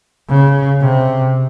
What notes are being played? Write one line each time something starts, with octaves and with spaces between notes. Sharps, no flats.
C#3
C3